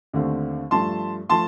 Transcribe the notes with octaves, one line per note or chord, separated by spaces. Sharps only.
D#2 D3 A3 C4
G2 F3 A3 A5 C6
F3 A3 A5 C6